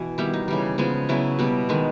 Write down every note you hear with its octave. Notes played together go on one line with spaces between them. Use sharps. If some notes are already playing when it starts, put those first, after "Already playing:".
Already playing: B2 E3
D#3 G3 B3 E4
D#4
C#3 E3 G3
C#3 F3 G#3 B3
C#3 F#3 B3 E4
B2 G3 B3
D#3 G#3 B3